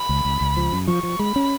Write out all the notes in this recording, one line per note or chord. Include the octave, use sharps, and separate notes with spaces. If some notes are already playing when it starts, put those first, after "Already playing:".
Already playing: B5
C#2
C#2
C#2
F3
F#2
F3 C#6
F3
G#3 B5
C#4